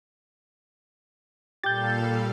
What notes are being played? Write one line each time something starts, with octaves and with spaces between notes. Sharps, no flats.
A#2 G3 G4 A4 F5 G6 A6